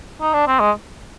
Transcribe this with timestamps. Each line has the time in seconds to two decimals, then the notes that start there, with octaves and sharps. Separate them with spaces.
0.21 D#4
0.33 D4
0.47 C4
0.60 G#3